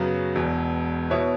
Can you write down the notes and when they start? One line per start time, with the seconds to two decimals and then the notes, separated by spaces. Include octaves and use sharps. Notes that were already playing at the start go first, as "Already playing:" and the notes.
Already playing: F#2 C#3 F#3 B3 F#4
0.35 E1 E2 B2
1.10 B2 B3 E4 C#5 E5